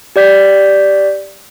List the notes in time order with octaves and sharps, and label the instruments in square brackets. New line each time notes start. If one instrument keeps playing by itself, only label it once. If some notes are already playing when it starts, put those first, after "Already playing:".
[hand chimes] G4 D5 G6 B6